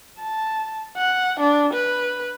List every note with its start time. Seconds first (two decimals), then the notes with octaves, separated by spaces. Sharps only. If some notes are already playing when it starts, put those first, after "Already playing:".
0.19 A5
0.97 F#5
1.40 D4
1.74 B4